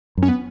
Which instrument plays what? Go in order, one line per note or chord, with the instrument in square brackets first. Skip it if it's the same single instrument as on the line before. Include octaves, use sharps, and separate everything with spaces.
[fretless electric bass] F#2
[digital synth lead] C#4
B3